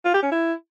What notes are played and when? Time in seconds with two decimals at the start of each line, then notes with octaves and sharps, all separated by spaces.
0.05 F4
0.14 G4
0.23 C#4
0.32 E4